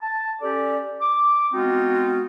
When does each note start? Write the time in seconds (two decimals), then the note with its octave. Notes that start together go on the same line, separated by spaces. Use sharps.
0.01 A5
0.41 C#4 G4 A4 D5
1.01 D6
1.53 G#3 B3 C4 D#4 F4 F#4